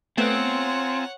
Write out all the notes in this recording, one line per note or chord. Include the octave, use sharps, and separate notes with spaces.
A3 B3 C4 F4 C#5 F#5 G#5 A#5